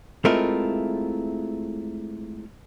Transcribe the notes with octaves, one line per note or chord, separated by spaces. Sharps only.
G#3 A3 C4 E4 F4 A#4